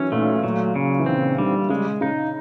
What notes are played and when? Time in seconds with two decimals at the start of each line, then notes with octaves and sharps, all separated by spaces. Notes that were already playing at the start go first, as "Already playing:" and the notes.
Already playing: D#3 E3 F#3 C#4
0.12 A#2 A3
0.43 A#2 F#3
0.76 C#3
0.99 E3
1.06 D#3 C4
1.38 D3 G3
1.69 C#3 G#3
2.01 C#3 D#4